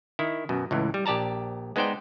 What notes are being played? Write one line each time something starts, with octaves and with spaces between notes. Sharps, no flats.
D#3 E4
F#2 B2
C#2 A2 E3
G3
A#1 G4 D5 A5 A#5
G#3 B3 D#4 C5 D5 G5